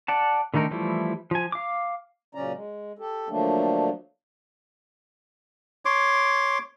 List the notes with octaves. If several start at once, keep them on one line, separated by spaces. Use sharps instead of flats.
D5 F#5 A5
D3 D#3 A3 D#4 A#4
E3 F3 G3 A3 E4
F3 G#5
F5 D6
A#2 C#3 F#3 C#4 D5 A#5
G#3
G4 A4
D3 F3 F#3 A3 A#3 D4
C#5 C6 D6